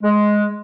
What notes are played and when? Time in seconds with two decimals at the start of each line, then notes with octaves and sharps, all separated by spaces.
0.03 G#3